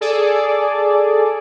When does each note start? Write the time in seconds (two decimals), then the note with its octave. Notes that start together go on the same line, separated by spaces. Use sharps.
0.01 G#4 A4 D5